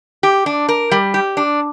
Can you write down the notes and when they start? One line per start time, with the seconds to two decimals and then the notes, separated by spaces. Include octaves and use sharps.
0.23 G4
0.46 D4
0.69 A#4
0.92 G3
1.14 G4
1.37 D4